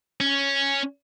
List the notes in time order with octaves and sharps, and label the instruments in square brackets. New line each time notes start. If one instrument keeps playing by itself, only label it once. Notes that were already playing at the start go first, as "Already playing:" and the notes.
[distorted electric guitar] C#4